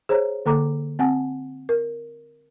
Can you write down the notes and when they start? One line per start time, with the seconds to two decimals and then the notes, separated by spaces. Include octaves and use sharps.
0.09 G#4 C5 C#5 A#5
0.46 D3 A#3 A4 A#5 D6
0.99 C4 F#5 G#5 A5
1.69 A#4